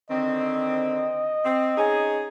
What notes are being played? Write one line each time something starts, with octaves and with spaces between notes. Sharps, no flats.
D3 D#3 C4 D#5
C4
C#4 D#4 G#4